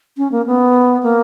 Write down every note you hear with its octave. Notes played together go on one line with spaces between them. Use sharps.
C#4
A#3
B3
A#3